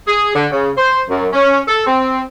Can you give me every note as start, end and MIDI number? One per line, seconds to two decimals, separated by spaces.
0.06 0.32 68
0.34 0.46 50
0.52 0.70 49
0.76 1.02 72
1.09 1.26 42
1.33 1.60 61
1.67 1.86 69
1.87 2.21 60